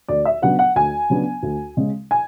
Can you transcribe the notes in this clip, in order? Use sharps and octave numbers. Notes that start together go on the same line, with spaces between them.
D2 D5
E5
C#3 F#3 B3 D4 F#5
F#5
D2 G#5
C#3 F#3 B3 D4
D2
C#3 G#3
G#5